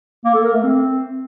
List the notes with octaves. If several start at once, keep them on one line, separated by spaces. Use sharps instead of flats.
A#3
A4
A#4
A3
C4